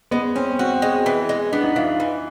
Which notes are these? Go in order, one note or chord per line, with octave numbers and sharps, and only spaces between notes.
G#3 B3
C4 C#4
C4 F#4
G#3
E3
G#3
B3 D4
D#4
E3 F4
F4
E3